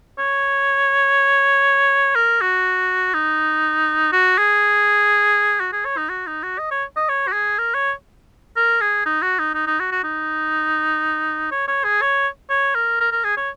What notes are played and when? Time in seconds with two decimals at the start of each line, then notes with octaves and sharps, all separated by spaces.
0.19 C#5
2.16 A#4
2.41 F#4
3.14 D#4
4.12 F#4
4.38 G#4
5.60 F#4
5.72 G#4
5.85 C#5
5.97 D#4
6.09 F#4
6.27 D#4
6.43 F#4
6.59 D#5
6.71 C#5
6.97 D#5
7.09 C#5
7.28 F#4
7.33 G#4
7.58 A#4
7.75 C#5
8.56 A#4
8.81 G#4
9.06 D#4
9.22 F#4
9.39 D#4
9.54 D#4
9.67 D#4
9.80 F#4
9.92 F#4
10.04 D#4
11.51 C#5
11.68 C#5
11.84 G#4
12.02 C#5
12.50 C#5
12.75 A#4
13.00 A#4
13.12 A#4
13.24 G#4
13.37 C#5